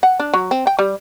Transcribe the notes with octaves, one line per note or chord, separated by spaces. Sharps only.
F#5
D4
F#3
C4
G5
G3